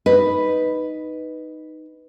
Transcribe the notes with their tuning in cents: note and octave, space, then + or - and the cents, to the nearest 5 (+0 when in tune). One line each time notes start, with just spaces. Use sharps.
D#4 +0 B4 +0 D#5 +0